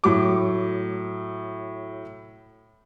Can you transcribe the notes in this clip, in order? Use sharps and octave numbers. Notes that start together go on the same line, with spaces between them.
A2 F#3 D6